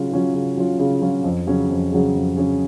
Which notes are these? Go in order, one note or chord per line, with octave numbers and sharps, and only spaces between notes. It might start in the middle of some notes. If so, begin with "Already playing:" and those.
Already playing: C#3 F#3 C#4 F4
F#3 C#4 F4
C#3
F#3 C#4 F4
C#3
F#3 C#4 F4
F2
C#3 F#3 C#4 G#4
F2
C#3 F#3 C#4 G#4
F2
C#3 F#3 C#4 G#4